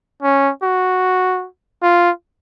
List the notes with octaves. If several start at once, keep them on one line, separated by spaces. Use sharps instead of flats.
C#4
F#4
F4